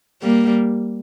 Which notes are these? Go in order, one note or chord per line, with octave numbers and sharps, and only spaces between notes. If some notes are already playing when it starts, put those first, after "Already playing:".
G3 A#3